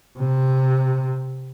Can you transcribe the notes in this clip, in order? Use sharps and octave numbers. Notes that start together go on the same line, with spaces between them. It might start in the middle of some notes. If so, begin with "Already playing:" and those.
C3